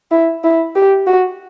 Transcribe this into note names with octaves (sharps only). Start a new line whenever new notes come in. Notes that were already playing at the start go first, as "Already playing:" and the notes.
E4
E4
G4
F#4